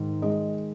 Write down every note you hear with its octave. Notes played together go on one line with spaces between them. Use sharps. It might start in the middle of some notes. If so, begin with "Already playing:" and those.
Already playing: G#2 D#3
G#3 D#5